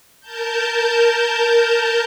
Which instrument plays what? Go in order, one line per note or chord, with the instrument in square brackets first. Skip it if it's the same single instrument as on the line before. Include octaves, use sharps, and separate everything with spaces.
[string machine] A#4 A5 G6